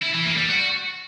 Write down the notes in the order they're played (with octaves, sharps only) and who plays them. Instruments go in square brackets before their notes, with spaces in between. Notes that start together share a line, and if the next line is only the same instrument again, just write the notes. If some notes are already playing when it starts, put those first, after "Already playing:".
[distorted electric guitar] E4
E3
A#3
G3
F#4